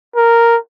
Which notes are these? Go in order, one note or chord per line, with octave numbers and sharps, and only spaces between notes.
A#4